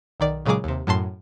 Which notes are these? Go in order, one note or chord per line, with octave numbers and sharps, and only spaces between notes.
B1 D#3 D5
A#2 C#3 F#3 G#3 G#4 D6
D#2 C3
F#2 A2 A5 C6